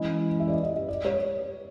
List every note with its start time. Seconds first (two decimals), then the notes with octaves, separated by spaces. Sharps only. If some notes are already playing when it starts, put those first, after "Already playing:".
Already playing: E3 G#3 C#4 E4 D#5
0.39 E5
0.48 D5
0.52 D#5
0.64 D#5
0.76 D#5
0.89 D5
1.05 C#5